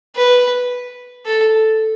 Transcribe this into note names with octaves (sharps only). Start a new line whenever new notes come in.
B4
A4